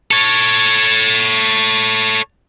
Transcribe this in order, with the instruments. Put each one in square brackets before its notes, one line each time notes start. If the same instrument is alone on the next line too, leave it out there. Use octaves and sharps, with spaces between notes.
[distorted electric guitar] A4 C#5